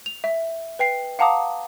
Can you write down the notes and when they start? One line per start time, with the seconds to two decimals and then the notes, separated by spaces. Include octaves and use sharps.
0.06 F7
0.24 E5
0.79 B4 G5 C7
1.19 F5 F#5 A5 A#5 D6 D#6